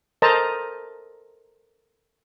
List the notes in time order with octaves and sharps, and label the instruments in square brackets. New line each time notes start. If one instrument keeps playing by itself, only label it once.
[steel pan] A4 A#4 C5 D#5 A5 A#5